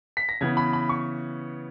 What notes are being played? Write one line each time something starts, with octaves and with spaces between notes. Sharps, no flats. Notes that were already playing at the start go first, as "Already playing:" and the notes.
B6
A#6
C#3 E3 B3 G#6
B5
B5
C#6